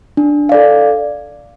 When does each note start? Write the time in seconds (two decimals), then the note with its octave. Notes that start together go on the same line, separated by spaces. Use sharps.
0.17 D4
0.49 A4 D5 F5